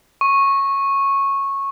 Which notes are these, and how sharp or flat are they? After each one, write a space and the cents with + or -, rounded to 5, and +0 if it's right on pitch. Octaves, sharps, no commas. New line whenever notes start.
C#6 -15